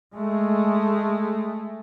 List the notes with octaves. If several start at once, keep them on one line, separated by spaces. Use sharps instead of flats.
G#3 A3